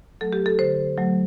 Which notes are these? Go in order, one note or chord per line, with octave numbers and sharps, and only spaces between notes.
F#3 A3 A4
G4
A4
D3 C5
F#3 A3